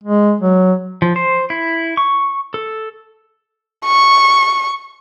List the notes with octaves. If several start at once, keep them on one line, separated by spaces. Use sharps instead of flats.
G#3
F#3
F3
C5
E4
C#6
A4
C#6